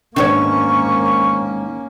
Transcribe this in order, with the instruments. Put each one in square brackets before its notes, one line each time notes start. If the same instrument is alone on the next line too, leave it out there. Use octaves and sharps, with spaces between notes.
[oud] E2 G#2 D#3 [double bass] A#3 C#4 [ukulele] D4 C#5 [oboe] C#6